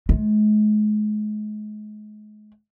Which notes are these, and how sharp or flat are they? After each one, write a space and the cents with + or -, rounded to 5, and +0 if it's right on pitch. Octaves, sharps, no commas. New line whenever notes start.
G#3 +35